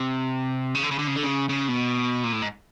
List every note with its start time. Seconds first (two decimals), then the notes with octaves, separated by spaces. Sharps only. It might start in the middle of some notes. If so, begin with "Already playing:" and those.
Already playing: C3
0.75 C#3
0.83 D3
0.91 C#3
0.99 D3
1.08 C#3
1.16 D3
1.23 C#3
1.49 C#3
1.68 B2
2.24 A#2
2.33 A2
2.42 G#2